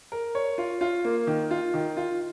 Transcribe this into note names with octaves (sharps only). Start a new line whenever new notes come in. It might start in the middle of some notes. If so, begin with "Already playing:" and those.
A#4
C#5
F4
F4
A#3
D#3
F4
D#3
F4